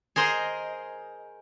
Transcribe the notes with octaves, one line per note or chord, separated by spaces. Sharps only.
G#4 A#4 C5 D#5